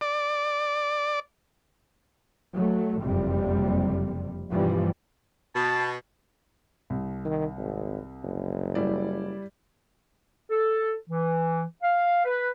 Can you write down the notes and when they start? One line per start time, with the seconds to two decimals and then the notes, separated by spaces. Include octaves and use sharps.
0.01 D5
2.54 F#3 A3
3.02 F#1 F2 C3 G3
4.51 G2 B2 E3 F3 G3
5.56 B2 A5
6.90 C2
7.25 D#3
7.58 G#1
8.23 F#1
8.75 G3 E4 D5
10.50 A4
11.09 E3
11.83 F5
12.25 B4